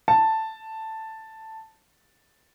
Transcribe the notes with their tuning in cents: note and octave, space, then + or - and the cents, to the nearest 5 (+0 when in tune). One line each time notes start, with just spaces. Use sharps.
A5 +5